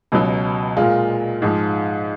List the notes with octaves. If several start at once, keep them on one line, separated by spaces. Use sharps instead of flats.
C#2 B2 F#3
A#2 G#3 F4
G#2 F3 G#3